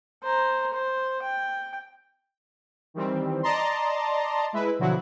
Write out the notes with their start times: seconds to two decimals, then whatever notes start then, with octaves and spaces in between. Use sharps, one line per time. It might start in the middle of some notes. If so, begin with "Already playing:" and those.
0.24 C5 A#5
0.73 C5
1.22 G5
2.94 D#3 E3 G3 C4
3.43 D5 D#5 A5 A#5 C6
4.53 G#3 E4 B4
4.79 B2 D3 F3 F#3 E4 F#4